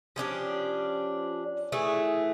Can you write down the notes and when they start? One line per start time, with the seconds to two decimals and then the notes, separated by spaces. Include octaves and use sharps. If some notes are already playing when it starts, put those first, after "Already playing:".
0.16 F3 C#4 D4 G4
1.72 E3 A3 G#4